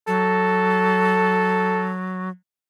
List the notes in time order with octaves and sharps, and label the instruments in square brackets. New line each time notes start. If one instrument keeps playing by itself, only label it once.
[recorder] F#3 [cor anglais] A4